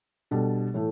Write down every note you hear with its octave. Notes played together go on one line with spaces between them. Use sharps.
B2 G3 D4 A4
A2 E3 A3